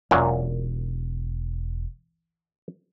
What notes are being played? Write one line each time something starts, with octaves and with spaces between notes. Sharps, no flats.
E1 F#2 A#2 F#3